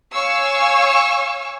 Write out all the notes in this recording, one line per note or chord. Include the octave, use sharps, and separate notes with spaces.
C#5 F5 G#5 C#6 E6